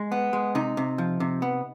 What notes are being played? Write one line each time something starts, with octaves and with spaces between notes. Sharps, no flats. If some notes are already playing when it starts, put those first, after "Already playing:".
Already playing: G#3
B3
G#3
C3 D#4
C3
F3
C3
B3